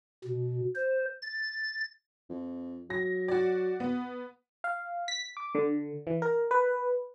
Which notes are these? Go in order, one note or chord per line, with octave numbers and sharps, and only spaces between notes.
B2
C5
A6
F2
F#3 A#6
F#4 D5
B3
F5
B6
D6
D3
E3
A#4
B4